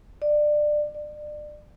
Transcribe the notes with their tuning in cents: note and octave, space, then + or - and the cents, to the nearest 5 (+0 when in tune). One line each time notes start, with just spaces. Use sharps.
D5 +20
D5 +30